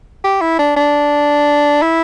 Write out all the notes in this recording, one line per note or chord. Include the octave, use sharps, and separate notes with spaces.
G4
E4
D4
D4
E4